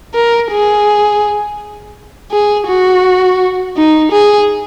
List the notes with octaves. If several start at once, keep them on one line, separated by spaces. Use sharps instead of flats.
A#4
G#4
G#4
F#4
D#4
G#4